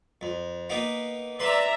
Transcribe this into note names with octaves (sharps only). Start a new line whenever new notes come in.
F2
A#3 B3 D#4
B4 D5 E5 A#5 C6